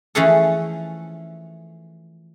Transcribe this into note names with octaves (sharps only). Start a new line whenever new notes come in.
E3 F3 A3 C#4 G#4 A4